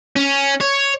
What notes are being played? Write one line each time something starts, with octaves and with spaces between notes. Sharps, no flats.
C#4
C#5